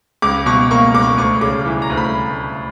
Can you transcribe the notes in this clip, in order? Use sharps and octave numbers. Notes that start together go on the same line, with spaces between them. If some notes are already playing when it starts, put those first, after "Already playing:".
C#2 D6
B2 C#6
A#3 C#6
C#2 D6
C#6
D2 C#6
C#3 D6
E3
A#5
D2
B5